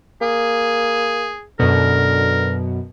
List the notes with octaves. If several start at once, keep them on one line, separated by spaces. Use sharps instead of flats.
A#3 G#4
F#2 B2 D3 A#4